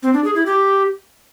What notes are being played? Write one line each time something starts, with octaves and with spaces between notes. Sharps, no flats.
C4
D4
G#4
E4
G4